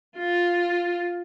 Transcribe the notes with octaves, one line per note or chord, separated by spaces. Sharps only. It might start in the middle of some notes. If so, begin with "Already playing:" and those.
F4